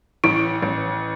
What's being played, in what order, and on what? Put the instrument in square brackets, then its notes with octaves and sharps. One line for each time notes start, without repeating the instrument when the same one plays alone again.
[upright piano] A1 [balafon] E4
[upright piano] A1